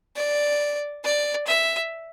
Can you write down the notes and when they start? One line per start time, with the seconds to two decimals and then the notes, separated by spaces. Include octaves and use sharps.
0.16 D5
1.04 D5
1.47 E5